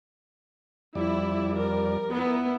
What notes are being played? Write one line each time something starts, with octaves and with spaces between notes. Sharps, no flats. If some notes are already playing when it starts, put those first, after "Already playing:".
F2 G3 E4 D5
A#4
B3 E4 A#4